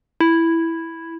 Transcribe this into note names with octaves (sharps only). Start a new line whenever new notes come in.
E4